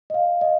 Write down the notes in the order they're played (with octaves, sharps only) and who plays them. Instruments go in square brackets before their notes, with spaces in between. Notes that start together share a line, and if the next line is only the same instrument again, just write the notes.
[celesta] D#5
F5
D#5